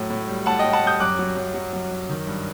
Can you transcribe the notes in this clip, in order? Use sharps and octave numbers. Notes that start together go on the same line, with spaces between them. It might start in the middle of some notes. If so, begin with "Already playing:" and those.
Already playing: A2 F#3
A2
G3
A2 F#5 A5
D#5 G5
A2
F#5 A5
G3 D#6 G6
F#2 D6 F#6
F#3
F#2
F#3
F#3
F#2
D#3
G2